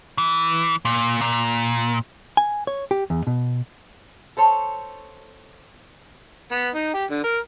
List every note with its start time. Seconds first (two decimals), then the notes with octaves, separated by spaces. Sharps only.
0.18 E3
0.85 A#2
1.21 A#2
2.37 G#5
2.67 C#5
2.91 G4
3.10 E2
3.27 B2
4.37 A4 C5 C#5
6.52 B3
6.75 D#4
6.94 G4
7.11 D3
7.24 A#4